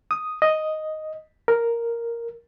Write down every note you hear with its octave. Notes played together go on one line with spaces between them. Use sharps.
D#6
D#5
A#4